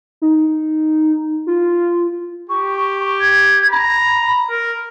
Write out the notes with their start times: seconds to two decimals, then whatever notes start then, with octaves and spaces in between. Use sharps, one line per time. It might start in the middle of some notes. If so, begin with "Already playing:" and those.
0.22 D#4
1.47 F4
2.49 G4 C#6
3.20 G#6
3.71 A#5 B5
4.50 A#4